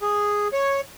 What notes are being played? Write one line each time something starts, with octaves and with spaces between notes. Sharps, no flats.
G#4
C#5